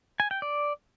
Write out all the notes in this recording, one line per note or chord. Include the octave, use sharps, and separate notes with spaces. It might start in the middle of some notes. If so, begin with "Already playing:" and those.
G#5
G5
D5